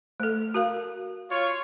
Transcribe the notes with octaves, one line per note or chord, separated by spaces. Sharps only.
A3 A4
F#4 A#4 F5
F4 C#5